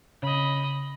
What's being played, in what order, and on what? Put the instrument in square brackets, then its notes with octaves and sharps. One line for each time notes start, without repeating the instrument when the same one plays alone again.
[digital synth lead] C#3 [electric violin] D#5 B5